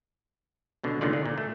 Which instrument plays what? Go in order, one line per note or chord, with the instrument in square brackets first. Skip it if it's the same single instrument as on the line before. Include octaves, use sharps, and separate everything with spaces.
[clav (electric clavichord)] C#2 B2 D3
C#2 A#2 D3 D#3 F4 D5
D3
A#2
A3